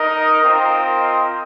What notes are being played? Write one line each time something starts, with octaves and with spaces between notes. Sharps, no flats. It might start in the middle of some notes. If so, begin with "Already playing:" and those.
Already playing: D#4 A#4 D#5
C4 F4 A#4 D#5